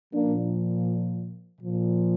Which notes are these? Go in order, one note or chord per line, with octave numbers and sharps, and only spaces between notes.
A#2 F3 A#3 D4
A#2 F3